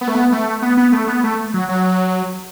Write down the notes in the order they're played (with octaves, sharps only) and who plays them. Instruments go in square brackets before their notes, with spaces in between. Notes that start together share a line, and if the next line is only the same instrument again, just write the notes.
[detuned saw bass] B3
A3
B3
A3
B3
B3
A3
B3
A3
F#3
F#3